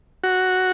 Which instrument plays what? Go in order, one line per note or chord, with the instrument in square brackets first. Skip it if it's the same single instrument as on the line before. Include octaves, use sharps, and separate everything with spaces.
[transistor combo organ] F#4